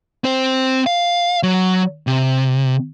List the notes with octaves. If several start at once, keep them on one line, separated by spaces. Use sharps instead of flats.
C4 C5
F5
F#3
C3